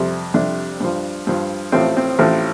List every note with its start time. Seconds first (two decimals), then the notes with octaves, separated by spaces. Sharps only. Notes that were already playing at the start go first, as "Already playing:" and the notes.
Already playing: F2 C3 G3
0.34 F2 C3 G3 D4
0.80 G2 F3
1.27 G2 F3
1.72 A1 A2 F3 C4
1.97 C4
2.19 A1 A2 F3